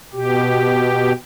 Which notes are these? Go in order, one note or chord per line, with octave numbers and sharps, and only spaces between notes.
B2 G4